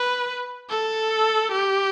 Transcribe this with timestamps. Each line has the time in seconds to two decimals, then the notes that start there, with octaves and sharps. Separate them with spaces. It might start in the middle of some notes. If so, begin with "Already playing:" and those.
Already playing: B4
0.70 A4
1.52 G4